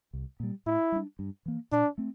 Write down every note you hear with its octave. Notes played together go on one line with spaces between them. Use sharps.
C2
A#2 G3
A2 E4
G3 D4
G2
E3 A#3
A#2 D4
A3 C4